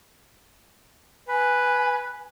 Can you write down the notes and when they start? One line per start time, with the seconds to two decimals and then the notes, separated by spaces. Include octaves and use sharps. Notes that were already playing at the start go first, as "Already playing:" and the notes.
1.28 B4 G#5